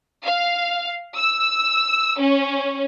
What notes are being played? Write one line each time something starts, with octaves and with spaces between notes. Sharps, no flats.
F5
E6
C#4